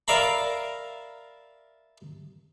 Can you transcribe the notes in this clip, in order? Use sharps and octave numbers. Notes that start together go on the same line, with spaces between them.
A#4 D5 E5 F5 A#5 B5